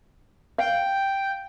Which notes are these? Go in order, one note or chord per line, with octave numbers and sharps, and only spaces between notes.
F5 G5